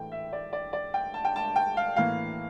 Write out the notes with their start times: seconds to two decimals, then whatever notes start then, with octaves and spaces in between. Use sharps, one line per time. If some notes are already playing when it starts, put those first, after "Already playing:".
Already playing: A2 E3 A3 G5
0.12 E5
0.33 D5
0.53 D5
0.73 D5
0.94 G5
1.14 A5
1.25 G5
1.36 A5
1.56 G5
1.77 F5
1.96 A2 E3 A#3 F5